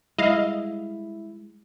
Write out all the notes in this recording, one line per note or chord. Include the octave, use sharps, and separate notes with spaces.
G3 G#3 E4 D#5 F5